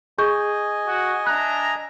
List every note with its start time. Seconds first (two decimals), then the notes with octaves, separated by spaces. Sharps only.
0.18 G#4 D#5 G#5 C#6 G6
0.86 F#4
1.27 D4 E5 A#5 F#6